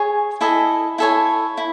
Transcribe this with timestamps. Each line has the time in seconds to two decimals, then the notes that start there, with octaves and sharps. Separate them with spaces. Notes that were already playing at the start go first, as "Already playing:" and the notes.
Already playing: G#4 C#5 G#5 C#6
0.41 E4 A4 D#5 G#5
0.98 E4 A4 C#5 G#5
1.58 E4